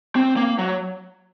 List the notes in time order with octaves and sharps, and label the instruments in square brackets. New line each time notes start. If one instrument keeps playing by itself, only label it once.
[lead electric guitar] C4
A#3
F#3